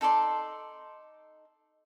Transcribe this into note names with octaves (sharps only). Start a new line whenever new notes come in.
D#4 A4 D5 C6